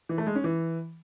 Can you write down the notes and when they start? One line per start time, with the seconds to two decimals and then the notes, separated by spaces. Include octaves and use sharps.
0.09 E3
0.18 A3
0.27 G#3
0.35 C#4
0.44 E3